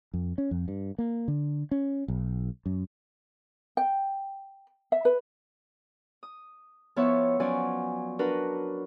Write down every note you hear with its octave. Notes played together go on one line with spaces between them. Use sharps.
F2
C#4
F2
G2
A#3
D3
C#4
B1
F#2
G5
E5
B4
D#6
F3 B3 E4 C#5 E5 C#6
F3 F#3 C#4 D5 G#5
D4 F#4 A#4 B4